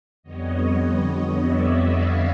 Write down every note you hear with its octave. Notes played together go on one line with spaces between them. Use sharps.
F2 D3 G3 B3 C#5 D#5
C#5 D#5
D5 E5
D#5 F5